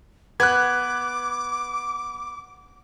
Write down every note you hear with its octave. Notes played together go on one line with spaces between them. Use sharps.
B3 D6 F#6 G#6